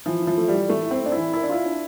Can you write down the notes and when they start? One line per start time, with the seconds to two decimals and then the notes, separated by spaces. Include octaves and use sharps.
0.06 E3 F3
0.22 E4
0.27 F3
0.37 A3
0.48 G3
0.54 E3
0.69 E3 A3
0.85 E4
0.91 C4
1.02 A3 D4
1.12 E4
1.17 E3
1.33 E4 A#4
1.43 D4
1.49 E4 F4
1.65 D4